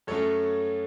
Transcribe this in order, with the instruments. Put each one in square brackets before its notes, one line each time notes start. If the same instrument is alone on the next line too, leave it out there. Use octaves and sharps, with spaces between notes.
[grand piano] F#2 F#3 A3 C#4 A4 C#5